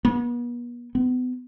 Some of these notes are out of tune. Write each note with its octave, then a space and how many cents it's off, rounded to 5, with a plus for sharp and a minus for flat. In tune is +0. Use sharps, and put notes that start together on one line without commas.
B3 -40
B3 +30